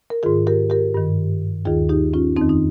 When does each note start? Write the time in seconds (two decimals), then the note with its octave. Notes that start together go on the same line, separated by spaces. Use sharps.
0.10 A#4
0.23 G#2 D#3 F4 G#4
0.47 G4 A#4
0.70 G4 A#4
0.94 G2 D#3
1.65 D#2 D#3 F4 G#4
1.89 D#4 G4
2.14 C#4 F4
2.36 F2 D#3 C4 D#4
2.49 D#4